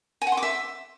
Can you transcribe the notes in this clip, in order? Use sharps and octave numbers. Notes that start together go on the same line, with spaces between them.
G#5
F#5
C6
D6
E5